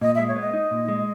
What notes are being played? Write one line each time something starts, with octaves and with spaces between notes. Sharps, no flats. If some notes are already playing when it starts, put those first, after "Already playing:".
A#2 D#5
E5
G#3
C#5
B3 D#5
D#4
A#2
G#3